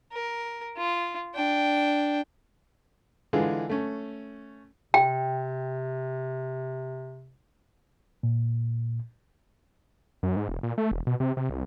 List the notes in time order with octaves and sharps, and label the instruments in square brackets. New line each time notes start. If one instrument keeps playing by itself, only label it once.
[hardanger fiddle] A#4
F4
D4 G5
[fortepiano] D3 E3 G#3 F4 G#4
A3 C#4
[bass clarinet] C3 [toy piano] G5
[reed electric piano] A#2
[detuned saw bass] F#2
G#2
E1
A#2
A3
E1
B2
C3
C3
C2